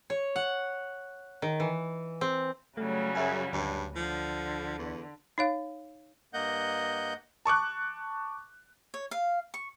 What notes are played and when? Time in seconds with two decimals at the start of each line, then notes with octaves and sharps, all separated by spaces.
0.10 C#5
0.36 F#5
1.42 D#3
1.60 E3
2.21 C4
2.77 C#3 F#3 G3 A3
3.15 F#2 G#4 E5 G#5
3.53 D2 G2
3.96 D3 F3
4.79 E2
5.38 D#4 C#5 F5
6.34 G2 A#3 D#5 F#5 G6
7.45 A5 C#6 D6 F#6
8.94 C#5
9.11 F5
9.54 C#6